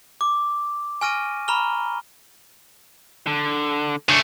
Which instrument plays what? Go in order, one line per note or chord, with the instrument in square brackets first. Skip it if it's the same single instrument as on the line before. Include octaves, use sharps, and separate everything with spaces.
[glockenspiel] D6
G#5 C#6 F6 A#6 D7 D#7
A#5 B5 C#6 F6 G7
[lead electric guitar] D3
[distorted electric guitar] C#3 A3 [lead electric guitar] D4